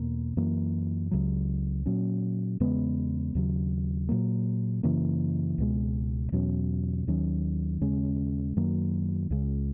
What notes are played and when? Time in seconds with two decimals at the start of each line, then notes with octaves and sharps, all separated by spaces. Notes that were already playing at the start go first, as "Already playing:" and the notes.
Already playing: E2 B2 A#3
0.37 F#2 E3 A#3
1.11 C#2 C#3 F#3
1.86 A#2 F#3 C#4
2.60 E2 C#3 G#3 B3
3.35 D#2 C#3 F#3
4.09 A#2 F#3 A#3
4.83 F#2 C#3 E3 A#3
5.58 C#2 B2 G#3
6.32 E2 B2 F#3 C#4
7.07 D#2 D#3 F#3 C#4
7.81 D#2 C#3 G#3 C#4
8.56 F#2 D#3 F#3 A#3
9.30 C#2 C#3 G#3